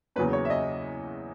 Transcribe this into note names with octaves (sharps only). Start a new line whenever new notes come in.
E2 C#3 F#3 A#3 C#4 B4
C#5
E5
D#5